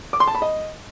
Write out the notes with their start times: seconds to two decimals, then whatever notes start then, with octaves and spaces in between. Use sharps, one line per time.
0.13 D6
0.20 C6
0.27 A5
0.35 B5
0.42 D#5